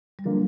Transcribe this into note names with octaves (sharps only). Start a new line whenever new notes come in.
G3
D3 F3 F#3 A#3